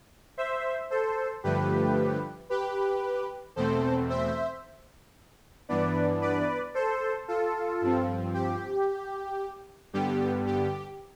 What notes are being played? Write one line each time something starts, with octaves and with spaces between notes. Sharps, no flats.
C5 E5
A4 C5
G2 D3 F3 A3 G4 B4
G4 B4
E2 B2 A3 C4 A4 C5
C5 E5
G2 E3 B3 D4 B4 D5
B4 D5
A4 C5
F4 A4
G2 F3 C4
G4
G2 D3 G3 B3 G4
G4